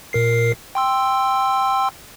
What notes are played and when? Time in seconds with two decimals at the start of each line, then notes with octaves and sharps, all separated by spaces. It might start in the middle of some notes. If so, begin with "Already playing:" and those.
0.13 A#2 A#4 C7
0.75 G5 C6 E6